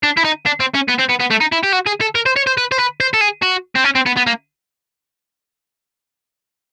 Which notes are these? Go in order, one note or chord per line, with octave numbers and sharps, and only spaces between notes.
D4
E4
D#4
D4
C4
C#4
B3
C4
B3
B3
A3
D#4
E4
G4
F#4
G#4
A4
A#4
C5
C#5
C5
B4
C5
B4
C5
A4
G#4
F#4
C4
C#4
C4
B3
B3
A#3